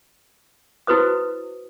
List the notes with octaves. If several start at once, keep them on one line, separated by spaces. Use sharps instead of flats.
E4 F#4 B4 C5 D#6